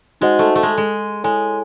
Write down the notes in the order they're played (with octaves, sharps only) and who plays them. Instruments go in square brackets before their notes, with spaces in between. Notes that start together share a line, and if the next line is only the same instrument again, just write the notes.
[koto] G#3 [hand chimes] D#4 F#4 C5 D#5 F#5
[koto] A3
A3
G#3
G#3
[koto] G#3 [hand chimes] E4 A4 C#5 G#5